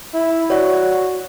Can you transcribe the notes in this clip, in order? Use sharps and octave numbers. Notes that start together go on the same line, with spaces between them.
E4
F#4 C#5 D5